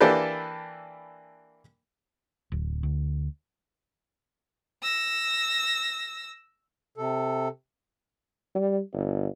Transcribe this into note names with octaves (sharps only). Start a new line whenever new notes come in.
E3 A#3 D4 G4 A4 B4
D1
D2
E6 A#6
C3 A4
G3
G1